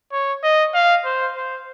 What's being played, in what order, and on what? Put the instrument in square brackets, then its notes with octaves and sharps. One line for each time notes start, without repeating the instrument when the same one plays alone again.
[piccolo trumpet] C#5
D#5
F5
C5
C5